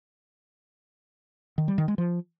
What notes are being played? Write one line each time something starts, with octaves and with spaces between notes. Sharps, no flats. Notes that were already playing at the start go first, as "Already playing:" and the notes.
D#3
G3
D#3
G#3
F3